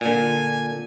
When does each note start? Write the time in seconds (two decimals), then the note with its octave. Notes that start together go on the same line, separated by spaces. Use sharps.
0.01 A#2 D3 G#5